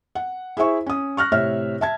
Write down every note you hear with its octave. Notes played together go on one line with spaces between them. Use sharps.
F#5
E4 G#4 C5 E5 C#6
C#4 D#6
C#6 F6 F#6 A#6
A2 C3 C#5 E5 F6
E5 A5 G#6